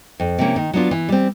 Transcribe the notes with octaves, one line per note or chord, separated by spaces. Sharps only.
F2
C3 F3 A#3 C#4
D#3
F#3 B3 D4 F4
E3
G3 C4